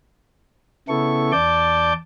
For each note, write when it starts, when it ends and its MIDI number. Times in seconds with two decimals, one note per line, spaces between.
0.89 1.32 49
0.89 1.32 59
0.89 1.32 64
0.89 1.32 69
0.89 1.32 85
1.32 1.93 40
1.32 1.93 74
1.32 1.93 81
1.32 1.93 86
1.32 1.93 91